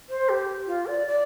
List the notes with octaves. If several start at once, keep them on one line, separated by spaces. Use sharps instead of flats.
C5
G4
F4
D5
D5